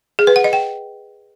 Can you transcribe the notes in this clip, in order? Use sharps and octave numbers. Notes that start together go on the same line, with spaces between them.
G#4
B4
F#5
D#5
G5